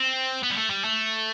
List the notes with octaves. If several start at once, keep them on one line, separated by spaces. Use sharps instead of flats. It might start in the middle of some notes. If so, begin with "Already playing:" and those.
Already playing: C4
B3
G3
A3
G3
A3